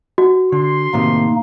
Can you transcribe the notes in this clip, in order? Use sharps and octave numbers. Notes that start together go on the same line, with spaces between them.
F#4
D3 C6
A2 C3 D#3 A#3 D#4